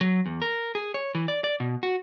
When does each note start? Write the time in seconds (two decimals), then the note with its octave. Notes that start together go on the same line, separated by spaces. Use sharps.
0.01 F#3
0.26 E2
0.42 A#4
0.75 G#4
0.94 C#5
1.15 E3
1.28 D5
1.44 D5
1.60 B2
1.83 F#4